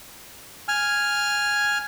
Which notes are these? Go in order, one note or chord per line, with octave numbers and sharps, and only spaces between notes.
G#5 F6